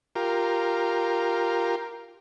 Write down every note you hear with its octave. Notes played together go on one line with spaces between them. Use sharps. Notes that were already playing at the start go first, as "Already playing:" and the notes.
F4 G4 A#4